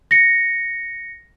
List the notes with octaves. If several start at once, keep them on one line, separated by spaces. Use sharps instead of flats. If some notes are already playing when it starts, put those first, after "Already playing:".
A#6 C#7